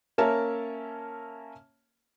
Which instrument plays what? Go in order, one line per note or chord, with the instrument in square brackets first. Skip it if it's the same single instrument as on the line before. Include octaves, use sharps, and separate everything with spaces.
[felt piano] A#3 C#4 A#4 C#5 E5 A5